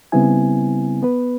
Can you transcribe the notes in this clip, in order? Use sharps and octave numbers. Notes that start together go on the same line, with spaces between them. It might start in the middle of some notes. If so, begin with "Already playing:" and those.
C#3 G3 B3 C4 E4 G#5
B3 B4